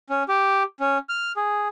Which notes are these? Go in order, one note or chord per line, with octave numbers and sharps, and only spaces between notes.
C#4
G4
C#4
F6
G#4